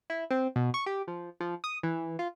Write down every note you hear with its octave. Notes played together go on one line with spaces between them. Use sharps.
E4
C4
B2
C#6
G4
F3
F3
D#6
E3
F4